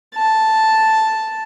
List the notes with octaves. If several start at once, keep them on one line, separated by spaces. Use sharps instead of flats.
A5